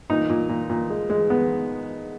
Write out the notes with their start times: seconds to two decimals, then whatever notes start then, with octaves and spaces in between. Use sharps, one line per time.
0.10 A#2 D#4
0.30 A#2
0.49 A#2
0.70 A#2
0.90 G#3
1.10 G#3
1.30 B3